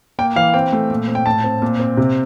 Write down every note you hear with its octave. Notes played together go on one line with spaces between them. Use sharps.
A#3 G5
E3 F5
C4 G5
A3
A#2
C4
G5
A2 A5
C4
A#2
C4
C3